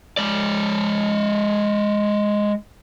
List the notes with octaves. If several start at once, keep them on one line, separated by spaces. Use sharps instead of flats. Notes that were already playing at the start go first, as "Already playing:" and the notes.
G#3 D5